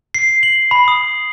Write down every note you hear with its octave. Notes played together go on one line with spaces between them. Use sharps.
C7
F#7
B5
D#6